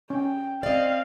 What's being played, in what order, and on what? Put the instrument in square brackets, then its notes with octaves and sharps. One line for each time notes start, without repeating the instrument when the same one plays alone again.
[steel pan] C#4 [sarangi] G5
[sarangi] C4 [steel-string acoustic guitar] D5 D#5 [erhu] F5